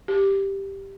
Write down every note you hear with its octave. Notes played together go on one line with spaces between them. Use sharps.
G4